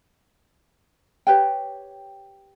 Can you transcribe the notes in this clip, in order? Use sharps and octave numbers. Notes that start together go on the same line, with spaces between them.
G4 B4 C#5 G5